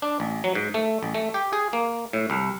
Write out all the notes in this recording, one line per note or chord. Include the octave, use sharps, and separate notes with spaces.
D4
A1
F#3
G#2
A3
A1
A3
G4
G#4
A#3
A2
C2